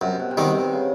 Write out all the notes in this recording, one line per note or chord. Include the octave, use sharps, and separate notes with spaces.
F#2 C3
B2
C3
B2 D#3 G3 C4
C3
C#3